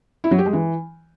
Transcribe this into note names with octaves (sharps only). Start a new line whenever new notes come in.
E4
F#3
G4
G#3
E3